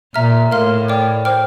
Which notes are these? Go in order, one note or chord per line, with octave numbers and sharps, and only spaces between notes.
A#2 E5 A#5 F6
A2 A#4 F5 C6 F6
D5 G5 D6 F6
C5 G5 D6 F6